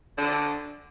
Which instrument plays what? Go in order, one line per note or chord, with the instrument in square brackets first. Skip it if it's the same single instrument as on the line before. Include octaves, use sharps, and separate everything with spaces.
[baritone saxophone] D3